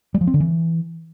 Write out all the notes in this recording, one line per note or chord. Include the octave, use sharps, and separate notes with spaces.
G3
F3
C4
D3
E3